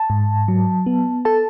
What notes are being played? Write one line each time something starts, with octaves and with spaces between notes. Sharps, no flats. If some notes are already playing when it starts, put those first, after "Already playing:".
Already playing: A5
G#2
F#3
B3
A4 A5